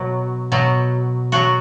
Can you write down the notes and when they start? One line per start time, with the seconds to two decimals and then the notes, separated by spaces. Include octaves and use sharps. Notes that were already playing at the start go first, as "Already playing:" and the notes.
Already playing: B2 F#3
0.52 B2 F#3
1.32 B2 F#3 F#4